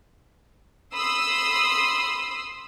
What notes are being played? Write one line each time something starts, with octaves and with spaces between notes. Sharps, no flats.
B5 C6 D#6 E6